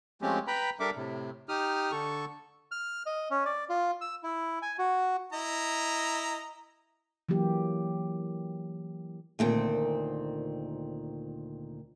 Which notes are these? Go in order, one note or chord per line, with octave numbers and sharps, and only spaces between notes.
F3 G#3 A3 C4 C#4 G4
B4 G5 A#5 B5
G3 D4 A4 A#4 E5 D6
A2 C3
D#4 G4 D#6 F6
D3 A4 C#6
F6
D#5
C#4
D5
F4
E6
E4
G#5
F#4
E4 D#5 A#5
E3 F#3 A#3 G4
D2 A#2 D#3 C4